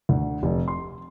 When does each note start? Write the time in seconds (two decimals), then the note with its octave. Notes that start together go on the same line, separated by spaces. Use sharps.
0.09 D2
0.43 F1
0.68 C6